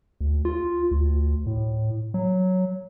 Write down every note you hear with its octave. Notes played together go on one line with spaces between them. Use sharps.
D2
F4
D2
A2
F#3